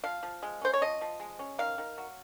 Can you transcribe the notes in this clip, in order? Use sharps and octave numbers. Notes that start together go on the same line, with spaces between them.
F3 F5
F3
G#3
C#4 C5
C#5
F3 D#5
F3
G#3
C#4
D#3 F5
D#3
F#3